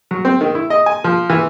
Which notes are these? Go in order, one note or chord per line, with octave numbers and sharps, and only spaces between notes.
F#3
C4
D#3
E4
D#5
G#5
F3
E3